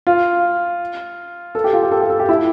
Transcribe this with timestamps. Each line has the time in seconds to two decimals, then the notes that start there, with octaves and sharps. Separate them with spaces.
0.07 F4
1.55 A4
1.64 G4
1.73 F4
1.83 G4
1.92 A4
2.01 G4
2.10 A4
2.20 G4
2.29 E4